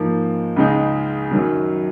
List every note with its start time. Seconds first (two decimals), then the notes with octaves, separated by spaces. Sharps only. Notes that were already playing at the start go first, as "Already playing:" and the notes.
Already playing: G#2 F3 A#3
0.56 C#2 C#3 G#3 D#4
1.31 F#2 D#3 F#3